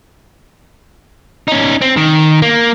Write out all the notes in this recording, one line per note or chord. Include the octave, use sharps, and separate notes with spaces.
C#4 D#4
C4
D#3
A#3